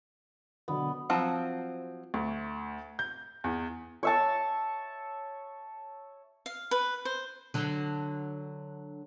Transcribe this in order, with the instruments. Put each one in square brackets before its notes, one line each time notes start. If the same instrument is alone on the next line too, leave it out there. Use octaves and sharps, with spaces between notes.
[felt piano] B2 D3 F#3 [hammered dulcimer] B3
[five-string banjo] F3 F#3 C4
[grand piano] D2
G6
E2
[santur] C#5 E5 A5
[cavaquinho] F5
B4
C5
[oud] D3 F#3